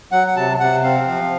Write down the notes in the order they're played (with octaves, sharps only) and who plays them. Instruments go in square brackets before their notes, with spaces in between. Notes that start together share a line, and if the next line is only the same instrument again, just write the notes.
[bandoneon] F#3 F#5
F#5
C3 A5
C3 F#5
C4 F5
F3 F5